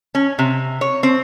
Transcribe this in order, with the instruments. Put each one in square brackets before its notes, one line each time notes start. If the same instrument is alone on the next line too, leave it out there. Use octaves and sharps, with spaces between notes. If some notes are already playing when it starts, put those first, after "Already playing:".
[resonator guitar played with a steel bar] C#4
C3
C#5
C4